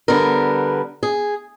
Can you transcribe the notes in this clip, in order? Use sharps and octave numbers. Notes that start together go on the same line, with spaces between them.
D3 G3 B3 A#4
G#4